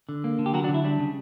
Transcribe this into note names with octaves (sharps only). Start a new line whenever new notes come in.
D3
A#3
D3
G4
F#3 F#4 A#4
D4 F#4
D3
E4
G3 D4
C#3